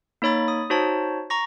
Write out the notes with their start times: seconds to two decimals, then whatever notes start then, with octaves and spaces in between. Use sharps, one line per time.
0.22 A#3 D#4 C#5 B5 A6
0.48 D#6
0.70 D#4 F#4 C5 C#5 A5
1.30 A#5 C#6 A#6